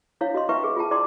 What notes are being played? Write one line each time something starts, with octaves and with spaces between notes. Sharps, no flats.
D4 E4 C#5 F5
F#4 D#5 C6
E4 B4 E5 G5 C#6
G#4 B4
F4 G#4 G5 A5
E4 D5 G5 C6 D6